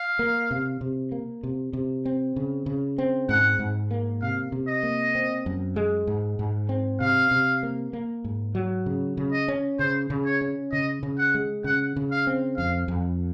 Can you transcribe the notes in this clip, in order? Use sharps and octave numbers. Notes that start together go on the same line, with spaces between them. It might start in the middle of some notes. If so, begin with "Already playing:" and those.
Already playing: F5
A#3
C3
C3
A#3
C3
C3
C4
C#3
C#3
C4
G#2 F#5
G#2
A#3
C3 F5
C3
D#5
A#3
C4
F#2
G#3
G#2
G#2
C4
C3 F5
C3
A#3
A#3
G#2
F#3
C#3
C#3
D#5
C#4
C#3 C5
C#3
C#5
C#4
C#3 D#5
C#3
F#5
G#3
C#3 F#5
C#3
F5
C4
F2 F5
F2